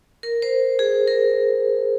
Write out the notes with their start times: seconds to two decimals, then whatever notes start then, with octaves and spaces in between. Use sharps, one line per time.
0.23 A#4
0.42 C5
0.79 G#4
1.08 A#4